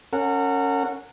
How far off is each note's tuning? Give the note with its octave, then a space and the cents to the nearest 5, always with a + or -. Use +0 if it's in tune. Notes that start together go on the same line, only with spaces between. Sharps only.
C#4 +0 A#4 -35 F#5 -15